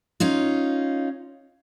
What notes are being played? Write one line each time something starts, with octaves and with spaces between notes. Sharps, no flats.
C#4 D#4 F4